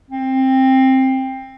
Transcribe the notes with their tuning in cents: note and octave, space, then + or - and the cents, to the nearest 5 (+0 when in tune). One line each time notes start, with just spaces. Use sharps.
C4 +15